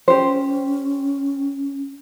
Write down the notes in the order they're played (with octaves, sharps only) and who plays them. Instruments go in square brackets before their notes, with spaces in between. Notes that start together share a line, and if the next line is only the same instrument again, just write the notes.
[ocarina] C#4 [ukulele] G4 C5